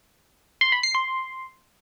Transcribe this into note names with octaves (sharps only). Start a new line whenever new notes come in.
C6
B5
C7
C6